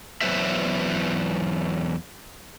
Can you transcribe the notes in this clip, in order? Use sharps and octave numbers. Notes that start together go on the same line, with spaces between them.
E2 F#3 B4 C5 E5